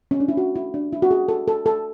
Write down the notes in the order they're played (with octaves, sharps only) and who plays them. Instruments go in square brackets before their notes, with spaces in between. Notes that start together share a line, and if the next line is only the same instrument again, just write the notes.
[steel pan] C#4
D4
E4
F#4
E4
D4
E4
F#4
G#4
A4
A4
A4